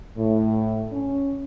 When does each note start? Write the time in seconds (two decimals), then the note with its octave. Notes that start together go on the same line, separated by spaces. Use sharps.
0.16 A2
0.93 C#4